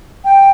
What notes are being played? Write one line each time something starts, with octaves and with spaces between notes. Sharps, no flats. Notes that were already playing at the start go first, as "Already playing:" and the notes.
G5